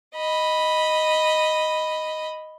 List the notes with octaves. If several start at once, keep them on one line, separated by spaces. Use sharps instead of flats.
D#5 B5